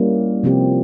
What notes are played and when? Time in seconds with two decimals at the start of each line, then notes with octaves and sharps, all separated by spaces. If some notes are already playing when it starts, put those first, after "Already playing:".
Already playing: G3 A#3 C#4 E4
0.43 C3 F3 C4 G4